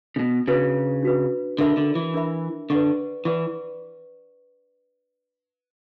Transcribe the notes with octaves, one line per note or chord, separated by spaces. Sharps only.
C#3
B2
C#3 D4 F#4 B4
D4 F#4 B4
D3 D4 A#4 E5 B5
D3
E3
D4 A#4 E5 B5
D3 B4 D5 F#5 C#6
E3 B4 D5 F#5 C#6